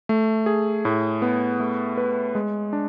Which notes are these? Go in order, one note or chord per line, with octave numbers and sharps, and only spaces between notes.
A3
G#4
A2
B3
A3
B4
G#3
D4